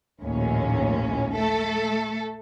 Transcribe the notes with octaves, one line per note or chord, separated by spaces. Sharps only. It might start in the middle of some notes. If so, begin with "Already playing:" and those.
A#1 D#2 A2 C#4
A3 A4